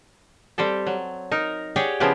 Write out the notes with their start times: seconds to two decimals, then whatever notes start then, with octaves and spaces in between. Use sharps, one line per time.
0.58 G3 C4 G4 A4
0.87 F#3
1.31 D#4 A#4
1.76 G4 G#4 C#5 D5 F#5 G5
2.00 C#3 F3 B3 E4 G4